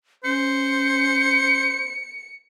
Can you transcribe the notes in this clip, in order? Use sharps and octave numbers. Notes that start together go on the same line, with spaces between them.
C#4 C5 C#7